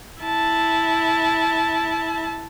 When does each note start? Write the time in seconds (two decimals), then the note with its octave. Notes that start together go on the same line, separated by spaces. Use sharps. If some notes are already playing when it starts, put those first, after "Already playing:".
0.22 E4 A5